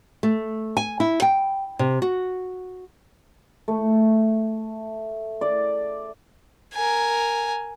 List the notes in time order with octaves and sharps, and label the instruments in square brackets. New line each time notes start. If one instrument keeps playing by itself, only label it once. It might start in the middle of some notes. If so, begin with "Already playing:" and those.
[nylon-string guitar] A3
G#5
E4
G5
C3
F#4
[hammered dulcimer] A3
D5
[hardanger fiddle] A#4 G#5